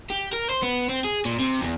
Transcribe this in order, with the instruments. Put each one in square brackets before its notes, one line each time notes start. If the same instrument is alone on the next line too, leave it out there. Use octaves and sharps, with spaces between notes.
[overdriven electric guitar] G4
A#4
C5
B3
C4
G#4
A#2
C3
E2